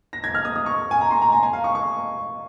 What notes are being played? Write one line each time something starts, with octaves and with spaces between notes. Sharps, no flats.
A#6
G#6
F6
D#6
D#6
C#6
G#5
A#5
C6
A#5
G#5
G#5
F5
C#6
C#6